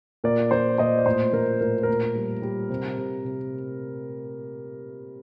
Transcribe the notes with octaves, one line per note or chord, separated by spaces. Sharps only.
A#2 A#4 D5
F3 C5
A#2 C5 D#5
D5
A2 C5
F3 A#4
A2 A#4
A#4
A#2
G3
G3
C3
C3
C3